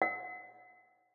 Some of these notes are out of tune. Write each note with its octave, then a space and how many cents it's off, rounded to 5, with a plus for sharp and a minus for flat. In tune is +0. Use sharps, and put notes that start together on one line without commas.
F#5 -25